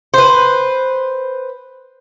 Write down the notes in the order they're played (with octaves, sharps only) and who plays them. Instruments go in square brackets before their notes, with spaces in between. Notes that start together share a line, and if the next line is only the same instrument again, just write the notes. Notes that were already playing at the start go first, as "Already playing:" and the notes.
[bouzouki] B4 C5